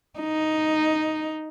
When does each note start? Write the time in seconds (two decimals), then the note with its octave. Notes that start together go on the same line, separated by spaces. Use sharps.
0.20 D#4